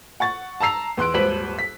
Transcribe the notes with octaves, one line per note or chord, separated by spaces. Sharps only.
F#5 C#6 A6
A5 A#5 E6 C7 F7
E2 C6 F#6 D7
D#1 G#1 B4 C5 B6 F#7
B6